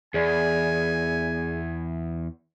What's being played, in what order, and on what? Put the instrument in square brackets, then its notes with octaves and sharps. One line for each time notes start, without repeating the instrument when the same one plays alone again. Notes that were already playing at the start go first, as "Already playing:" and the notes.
[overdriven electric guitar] E2 [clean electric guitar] G#4 D5 [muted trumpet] G#5